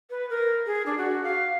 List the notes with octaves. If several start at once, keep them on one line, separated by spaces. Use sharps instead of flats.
B4
A#4
G#4
D4
F#4
F5